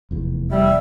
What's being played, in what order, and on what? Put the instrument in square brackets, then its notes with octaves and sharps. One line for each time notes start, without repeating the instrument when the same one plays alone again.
[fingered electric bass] F1 E2
[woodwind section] G3 [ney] E5